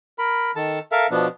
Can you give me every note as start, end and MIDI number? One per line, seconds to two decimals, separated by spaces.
0.19 0.51 70
0.19 0.51 83
0.56 0.79 51
0.56 0.79 69
0.56 0.79 81
0.92 1.07 69
0.92 1.07 70
0.92 1.07 76
0.92 1.07 77
1.11 1.27 47
1.11 1.27 53
1.11 1.27 59
1.11 1.27 62